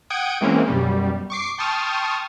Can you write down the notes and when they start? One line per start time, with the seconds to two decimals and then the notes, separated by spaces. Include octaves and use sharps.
0.10 F#5 G5 D#6 G#6 D7
0.41 E3 G#3 A#3 C4 C#4
0.68 F#2 B2 G3
1.30 C#6 D6 C7
1.58 G5 A5 C6 C#6 D#6 F6